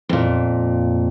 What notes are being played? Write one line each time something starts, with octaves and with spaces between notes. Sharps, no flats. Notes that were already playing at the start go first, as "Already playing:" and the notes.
F2 A#2